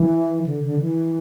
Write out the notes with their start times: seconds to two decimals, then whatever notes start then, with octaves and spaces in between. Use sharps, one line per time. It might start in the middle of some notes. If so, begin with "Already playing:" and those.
Already playing: E3
0.46 D3
0.64 D3
0.80 E3